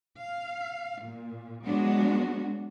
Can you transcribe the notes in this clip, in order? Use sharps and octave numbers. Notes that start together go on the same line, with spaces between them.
F5
A#2
F#3 G#3 B3 D4 F#4